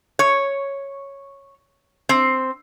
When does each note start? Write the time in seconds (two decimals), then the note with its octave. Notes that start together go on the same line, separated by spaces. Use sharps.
0.19 C#5
2.09 C4